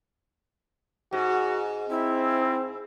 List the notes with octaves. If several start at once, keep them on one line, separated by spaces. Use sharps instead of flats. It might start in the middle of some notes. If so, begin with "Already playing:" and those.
G#2 F#4
C4 E4